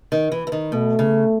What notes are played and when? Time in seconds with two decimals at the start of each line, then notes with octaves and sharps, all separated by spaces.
0.12 D#3
0.32 E3
0.47 E3
0.52 D#3
0.72 B2 A3
0.99 C#3